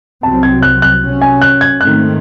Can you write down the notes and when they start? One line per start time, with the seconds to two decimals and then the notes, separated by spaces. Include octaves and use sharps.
0.23 C2 C3 F#3 C4 A5
0.43 G#6
0.63 F#6
0.82 F#6
1.02 C3 F#3 C#4
1.21 G#5
1.42 F#6
1.61 G#6
1.81 G#2 D#3 A3 C4 F#6